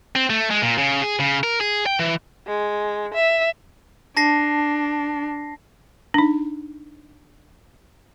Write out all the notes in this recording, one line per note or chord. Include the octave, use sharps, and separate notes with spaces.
C4
A3
G#3
A#2
C#3
G#4
C#3
A#4
G#4
G5
E3
G#3
E5
D4 A5 A#6 C7
D4 D#4